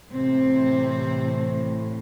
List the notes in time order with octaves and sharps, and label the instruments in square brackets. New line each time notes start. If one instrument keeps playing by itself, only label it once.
[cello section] A2 C3 E3 C4